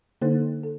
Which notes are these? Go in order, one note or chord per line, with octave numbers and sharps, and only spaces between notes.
D3 A#3 D4 D#4 A4 C5
A4